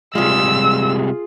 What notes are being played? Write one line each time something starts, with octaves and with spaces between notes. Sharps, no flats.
C3 G3 G#3 F4 G#4 E6